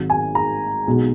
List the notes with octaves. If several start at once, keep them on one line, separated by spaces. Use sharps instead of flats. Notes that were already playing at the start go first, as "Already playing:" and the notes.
Already playing: G#1 G#2 F#3
G#5
A#5
B1 B2 G#3